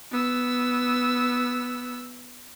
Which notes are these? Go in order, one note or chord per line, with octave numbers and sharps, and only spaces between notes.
B3 E6